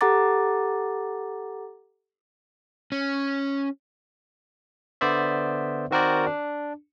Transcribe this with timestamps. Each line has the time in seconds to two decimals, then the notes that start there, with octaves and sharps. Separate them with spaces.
0.01 G4 A4 F#5 A#5 D6 A6
2.92 C#4
5.01 D3 B3 C5 D5 E5
5.91 D#3 C4 F#4 A#4 C5 D5
6.27 D4